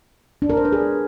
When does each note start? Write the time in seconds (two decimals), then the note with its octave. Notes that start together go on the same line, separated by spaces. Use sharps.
0.42 D4
0.50 A#4
0.57 C5
0.65 B4
0.72 G#4